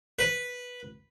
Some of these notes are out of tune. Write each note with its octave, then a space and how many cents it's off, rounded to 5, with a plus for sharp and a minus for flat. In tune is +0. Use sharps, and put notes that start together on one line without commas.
B4 -5